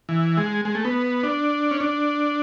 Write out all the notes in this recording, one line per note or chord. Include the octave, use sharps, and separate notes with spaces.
E3
G#3
G#3
A3
B3
D4
C#4
D4